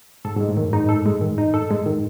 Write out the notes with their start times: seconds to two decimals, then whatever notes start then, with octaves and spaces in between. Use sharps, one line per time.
0.25 G#2 A4
0.36 G#2 G#3
0.49 A2
0.57 F#2 D#3
0.73 G#2 D#4
0.89 A4
1.06 G#3
1.21 D#3
1.38 D#4
1.54 A4
1.71 G#3
1.86 D#3